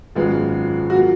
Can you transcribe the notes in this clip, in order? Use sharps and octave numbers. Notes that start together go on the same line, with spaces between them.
G#1 F#2 F3 G#3 B3 F4
F#4
F#3 A#3 F4